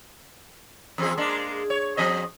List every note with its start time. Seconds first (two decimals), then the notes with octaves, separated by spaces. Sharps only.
0.98 E2 C4 G#4
1.18 G#3 A#3 D4
1.70 C#5
1.97 F3 C4 D#5